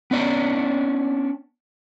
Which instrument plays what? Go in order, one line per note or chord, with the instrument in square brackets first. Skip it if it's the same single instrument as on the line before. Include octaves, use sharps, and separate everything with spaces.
[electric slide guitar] B3 C#4 D4 D5